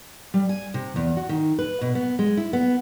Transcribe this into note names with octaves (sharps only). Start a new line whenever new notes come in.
G3
G#5
C3
E2
F#4
D#3
B4
B2
B3
G#3
E4
B3